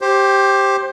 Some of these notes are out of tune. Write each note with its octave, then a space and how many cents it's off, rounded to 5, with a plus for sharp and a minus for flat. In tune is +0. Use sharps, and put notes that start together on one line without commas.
G4 +0 C5 +20